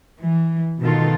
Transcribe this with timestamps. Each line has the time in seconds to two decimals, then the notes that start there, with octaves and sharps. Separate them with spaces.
0.19 E3
0.82 B2 D#3 B3 F4 A4